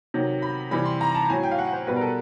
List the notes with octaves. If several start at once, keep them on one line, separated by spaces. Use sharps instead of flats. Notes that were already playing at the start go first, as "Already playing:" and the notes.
C3 D#3 F#3
B5
C3 E3 G3 B5
C6
A#5
A5
A2 F#3 G#5
G5
F5
F#5
C5
B2 G3 B4
A#4
A4